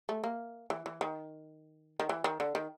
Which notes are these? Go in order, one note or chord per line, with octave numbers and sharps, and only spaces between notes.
A3
A#3
E3
E3
D#3
D#3
E3
D#3
D3
D#3